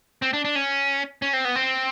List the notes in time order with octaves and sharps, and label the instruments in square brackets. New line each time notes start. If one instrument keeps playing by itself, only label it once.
[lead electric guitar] C4
D4
D4
C#4
C#4
C4
B3
C4